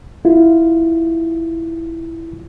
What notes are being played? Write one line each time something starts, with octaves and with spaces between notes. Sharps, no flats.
E4 F4